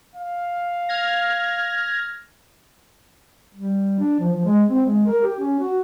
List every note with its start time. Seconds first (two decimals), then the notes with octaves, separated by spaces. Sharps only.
0.16 F5
0.89 F6 G#6 A#6
3.55 G3
3.99 D4
4.19 F3
4.33 F3
4.46 G#3
4.70 C4
4.86 G#3
5.07 A#4
5.23 G4
5.39 C#4
5.60 F#4